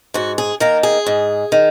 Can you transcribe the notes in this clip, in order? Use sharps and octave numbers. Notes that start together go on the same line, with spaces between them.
G#2 F#4
G#4
D#3 A#3 A#4
G#4
G#2
D#3